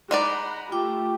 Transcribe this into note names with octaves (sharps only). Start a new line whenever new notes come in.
G#3 D#4 D5 F#5 A#5 B5
A3 F4 G4 G5 D6